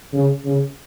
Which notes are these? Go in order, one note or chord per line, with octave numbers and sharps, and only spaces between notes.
C#3
C#3